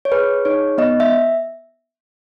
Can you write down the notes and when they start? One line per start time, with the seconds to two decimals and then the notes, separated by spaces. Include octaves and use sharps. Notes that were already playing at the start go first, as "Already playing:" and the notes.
0.05 C#5
0.12 G#4 B4
0.45 D#4 C#5
0.78 B3 D#5
1.00 E5